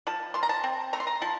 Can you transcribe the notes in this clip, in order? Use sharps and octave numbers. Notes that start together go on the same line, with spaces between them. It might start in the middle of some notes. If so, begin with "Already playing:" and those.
F3 A5
F3 C6
A#5
A5
C4
A3 A#5
C6
A#5
F3 A5